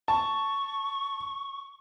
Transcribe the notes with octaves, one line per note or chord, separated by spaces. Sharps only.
A5 C#6